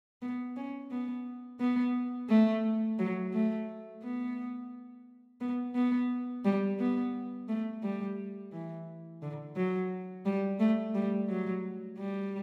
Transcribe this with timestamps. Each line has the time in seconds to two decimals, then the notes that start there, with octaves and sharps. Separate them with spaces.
0.22 B3
0.56 C#4
0.91 B3
1.60 B3
2.29 A3
2.99 F#3
3.33 A3
4.03 B3
5.41 B3
5.75 B3
6.45 G3
6.79 B3
7.49 A3
7.83 G3
8.52 E3
9.22 D3
9.56 F#3
10.26 G3
10.60 A3
10.95 G3
11.29 F#3
11.98 G3